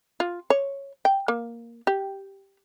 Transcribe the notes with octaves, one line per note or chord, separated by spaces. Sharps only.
F4
C#5
G5
A#3
G4